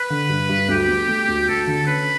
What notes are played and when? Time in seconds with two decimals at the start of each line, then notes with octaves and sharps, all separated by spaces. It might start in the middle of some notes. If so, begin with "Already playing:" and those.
Already playing: B4
0.10 D3
0.29 G2
0.49 G2
0.68 D2 G4
0.88 A3
1.08 A3
1.28 D2
1.48 D2 A4
1.67 D3
1.87 C#4 B4